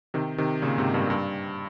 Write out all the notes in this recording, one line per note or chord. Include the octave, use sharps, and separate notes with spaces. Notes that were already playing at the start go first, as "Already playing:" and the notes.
C3 D#3
C3 D#3
A#2 C#3
G#2 C3
G2 A#2
G2